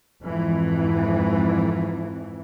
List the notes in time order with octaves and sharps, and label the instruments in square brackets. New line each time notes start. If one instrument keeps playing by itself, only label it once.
[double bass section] F2 G#2 E3